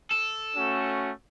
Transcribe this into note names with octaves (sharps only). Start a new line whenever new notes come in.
A4
A3 C#4 F#4